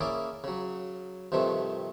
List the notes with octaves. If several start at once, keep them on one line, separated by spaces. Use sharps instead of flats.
A#3 C#4 E4 G#4 D5
C#3 F#3
G2 C3 D#3 F3 A3